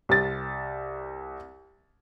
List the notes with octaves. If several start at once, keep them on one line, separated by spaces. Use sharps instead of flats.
C2 A6